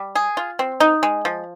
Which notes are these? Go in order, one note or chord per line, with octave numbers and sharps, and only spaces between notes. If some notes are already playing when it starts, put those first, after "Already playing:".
Already playing: G3
G#4
F4
C4
D#4
G#3
F3